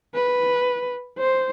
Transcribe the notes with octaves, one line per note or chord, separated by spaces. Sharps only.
B4
C5